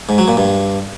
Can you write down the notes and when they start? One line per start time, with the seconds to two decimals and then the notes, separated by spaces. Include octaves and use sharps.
0.09 G#2
0.18 F#3
0.28 A#2
0.37 G2